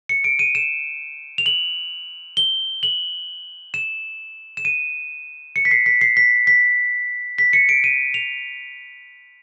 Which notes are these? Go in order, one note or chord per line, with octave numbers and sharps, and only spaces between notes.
C#7
D7
D#7
E7
F7
F#7
G7
F#7
E7
E7
D#7
C#7
B6
C7
B6
C7
B6
B6
B6
C#7
D7
D#7
F7